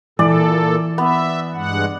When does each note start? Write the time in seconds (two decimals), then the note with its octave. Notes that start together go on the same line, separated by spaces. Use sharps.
0.19 A#2 E3 A4 D5
0.98 B3 E5
1.54 G2 G#3 F#5